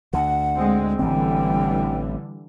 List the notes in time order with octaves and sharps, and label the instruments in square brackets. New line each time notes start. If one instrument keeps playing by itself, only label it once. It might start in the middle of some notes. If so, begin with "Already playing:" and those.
[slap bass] D2 D3 [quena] F#5
[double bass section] G#3 C4
[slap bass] A1 C4 [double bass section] D3 E3 G3 [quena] G5